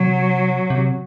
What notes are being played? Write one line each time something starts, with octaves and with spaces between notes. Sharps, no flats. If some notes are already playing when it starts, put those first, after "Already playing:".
Already playing: C3 F#3
C3